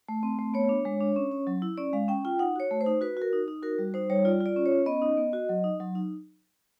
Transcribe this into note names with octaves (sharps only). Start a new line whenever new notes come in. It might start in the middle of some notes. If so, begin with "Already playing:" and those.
A3
C4
A3
B3 C#5
D4
G#3
D4
C#4
C#4
F#3
E4
C#4 D5
G#3 F5
C#4 G5
F4 G5
D#4 F#5
F#4 C#5
A3
C5
D#4
F#4 B4
F#4 A#4
D#4
D#4
F#4 A#4
G3
D#4 C5
G3 C#5
F4 D5
F4
D5
C#4
C#5
C#4
B3 D#5
D#4
B3
F#4
F#3
D#4
F#3
D#4